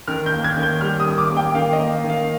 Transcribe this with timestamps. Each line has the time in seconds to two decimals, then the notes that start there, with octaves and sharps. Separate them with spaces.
0.08 D#3 F6
0.26 G6
0.32 A#3
0.44 G#6
0.57 D#3
0.63 G6
0.81 G3 F6
1.00 D#6
1.05 D#3
1.18 D6
1.30 A#3
1.37 G5
1.55 D#3 F5
1.73 D#5
1.79 A#3
2.04 D#3
2.10 F5